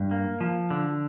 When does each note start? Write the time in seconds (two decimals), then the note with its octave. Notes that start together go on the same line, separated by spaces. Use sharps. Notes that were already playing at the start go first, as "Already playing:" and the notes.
Already playing: G2
0.11 A#3
0.41 F3
0.70 D3